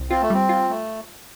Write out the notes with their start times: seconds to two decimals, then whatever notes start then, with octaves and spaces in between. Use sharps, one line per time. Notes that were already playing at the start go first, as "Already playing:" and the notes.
Already playing: C2
0.10 C4 F4
0.22 A3
0.30 G3 C4
0.49 F4
0.69 A3